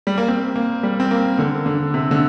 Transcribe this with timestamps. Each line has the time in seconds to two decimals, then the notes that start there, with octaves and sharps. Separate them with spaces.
0.07 G3
0.18 A#3
0.28 C4
0.56 A#3
0.83 G3
1.00 C4
1.11 A#3
1.39 D3
1.66 D3
1.94 C3
2.11 D3